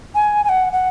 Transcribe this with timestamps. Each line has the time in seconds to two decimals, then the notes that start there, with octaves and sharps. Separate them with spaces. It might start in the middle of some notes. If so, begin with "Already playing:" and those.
0.15 G#5
0.44 G#5
0.49 F#5
0.73 F#5